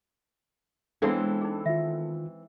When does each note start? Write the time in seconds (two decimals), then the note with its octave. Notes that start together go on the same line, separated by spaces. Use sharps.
1.02 E3 G#3 B3 C4 D4 A4 C5 F5
1.41 D#4 G#4
1.66 D#3 F4 E5